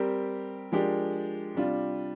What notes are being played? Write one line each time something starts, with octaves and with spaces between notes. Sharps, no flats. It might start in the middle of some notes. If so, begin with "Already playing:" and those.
Already playing: G3 C4 G4 A#4
F3 G#3 D4 G4 A#4
C3 G3 D4 F4